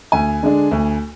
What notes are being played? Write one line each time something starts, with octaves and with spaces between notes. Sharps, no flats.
D2 G#5
D3 G#3 D4
D2